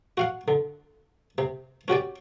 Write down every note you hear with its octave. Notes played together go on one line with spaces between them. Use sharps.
F#4 F5 F#5
D3
C3
C#4 F#4 G4 D5